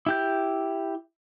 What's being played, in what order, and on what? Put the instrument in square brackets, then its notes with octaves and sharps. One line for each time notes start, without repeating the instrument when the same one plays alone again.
[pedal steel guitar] E4 G4 G6